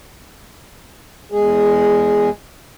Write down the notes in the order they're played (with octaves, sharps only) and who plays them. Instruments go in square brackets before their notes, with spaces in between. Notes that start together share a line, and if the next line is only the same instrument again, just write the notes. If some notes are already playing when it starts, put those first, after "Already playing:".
[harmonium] E2 G#3 G#4